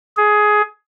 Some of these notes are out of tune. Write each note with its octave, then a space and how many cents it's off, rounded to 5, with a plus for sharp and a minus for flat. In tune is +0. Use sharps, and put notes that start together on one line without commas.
G#4 +15